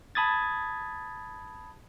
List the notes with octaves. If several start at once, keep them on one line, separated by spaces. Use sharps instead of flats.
A5 B5 D#6 G#6 A6